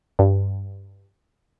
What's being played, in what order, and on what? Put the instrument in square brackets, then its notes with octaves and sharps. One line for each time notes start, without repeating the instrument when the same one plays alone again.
[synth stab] G2